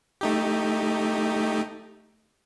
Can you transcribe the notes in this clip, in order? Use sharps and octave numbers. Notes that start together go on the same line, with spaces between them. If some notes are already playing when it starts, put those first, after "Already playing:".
A3 D#4 G4